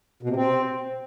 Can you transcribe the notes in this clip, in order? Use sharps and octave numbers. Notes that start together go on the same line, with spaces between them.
B2
C3
C4